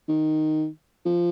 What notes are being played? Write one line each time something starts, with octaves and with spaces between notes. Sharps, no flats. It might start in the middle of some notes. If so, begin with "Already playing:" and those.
D#3
F3